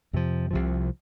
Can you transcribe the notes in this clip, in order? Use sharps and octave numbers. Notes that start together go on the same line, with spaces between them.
F2 C3 F3
C2 C3 F3